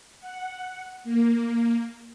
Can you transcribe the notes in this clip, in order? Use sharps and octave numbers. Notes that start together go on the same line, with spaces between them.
F#5
A#3